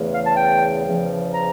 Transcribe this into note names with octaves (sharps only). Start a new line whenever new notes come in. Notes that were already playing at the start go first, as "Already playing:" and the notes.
Already playing: E2 C#3 E3 A3
F5
A5
G5
E2 C#3 F3
A#5